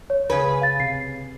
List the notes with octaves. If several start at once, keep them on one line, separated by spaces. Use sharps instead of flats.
C#5
C#2 C#3 G#4 B4
F5 A6
C3 C7